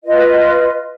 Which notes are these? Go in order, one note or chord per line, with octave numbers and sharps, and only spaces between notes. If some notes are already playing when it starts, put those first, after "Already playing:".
F4 B4 D#5